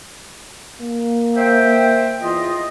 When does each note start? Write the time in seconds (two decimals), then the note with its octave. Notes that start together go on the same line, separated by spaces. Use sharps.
0.81 A#3
1.36 C5 E5 G5
2.21 E2 F4 D#5